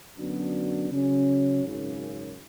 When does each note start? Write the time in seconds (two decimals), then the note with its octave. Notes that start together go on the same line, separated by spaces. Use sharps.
0.17 F#2 D3 F#3 B3 D4
0.90 C#3 F#3 C#4
1.63 G#1 F#2 C#3